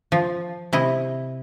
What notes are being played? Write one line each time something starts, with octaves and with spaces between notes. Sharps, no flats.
F3
C3 E4 D#5